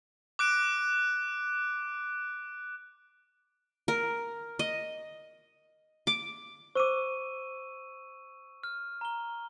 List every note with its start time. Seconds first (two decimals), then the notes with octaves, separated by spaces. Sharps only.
0.39 D6 F#6 D7
3.88 A#4
4.59 D#5
6.07 D6
6.75 C5 C#6 D6 E6 D#7
8.64 F6
9.01 A#5 G7